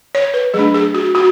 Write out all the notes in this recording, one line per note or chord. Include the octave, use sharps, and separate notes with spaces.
C#5
B4
F#3 A3 D4 G#4
G#4
F#4
F#4